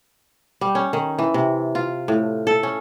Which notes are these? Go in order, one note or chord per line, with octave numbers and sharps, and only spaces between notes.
G3
C#4
D#3
E3
C3
F4
A2
A4
C#4